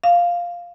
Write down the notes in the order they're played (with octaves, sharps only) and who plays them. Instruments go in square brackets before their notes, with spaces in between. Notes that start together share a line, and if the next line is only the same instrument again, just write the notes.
[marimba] F5